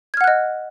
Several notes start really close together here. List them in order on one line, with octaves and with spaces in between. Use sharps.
G#6 F6 F#5 F#6 D#5